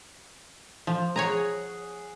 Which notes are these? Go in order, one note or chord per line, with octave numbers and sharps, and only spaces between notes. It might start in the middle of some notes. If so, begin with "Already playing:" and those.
F3
G#4 C#5 F#5 G#5 A#5